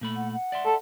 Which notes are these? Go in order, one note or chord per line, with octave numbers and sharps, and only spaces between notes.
A#2 A3 B5
F#5
F#5
D5 E5 C6
A4